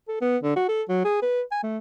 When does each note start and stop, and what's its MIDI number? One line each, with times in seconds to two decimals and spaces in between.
0.08 0.16 69
0.21 0.37 59
0.43 0.55 50
0.56 0.65 66
0.68 0.82 69
0.89 1.03 54
1.04 1.17 68
1.22 1.41 71
1.51 1.60 80
1.63 1.79 57